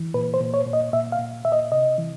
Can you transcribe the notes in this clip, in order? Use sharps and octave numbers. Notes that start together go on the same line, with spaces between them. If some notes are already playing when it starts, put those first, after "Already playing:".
Already playing: E3
A#2 B4
C5
A#2
C#5
A#2
D#5
A#2 E5
F5
A#2
A#2 E5
D#5
C3 D#5
E3